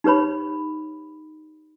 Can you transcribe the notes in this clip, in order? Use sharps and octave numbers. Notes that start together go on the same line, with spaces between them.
D#4 G4 B4 C#5 B5